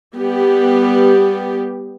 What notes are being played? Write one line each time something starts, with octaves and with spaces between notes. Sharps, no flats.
G3 B3 G4